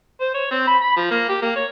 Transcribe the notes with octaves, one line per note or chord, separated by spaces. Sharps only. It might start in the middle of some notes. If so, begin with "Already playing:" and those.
C5
C#5
C4
B5
B5
F3
A#3
G4
A#3
C#5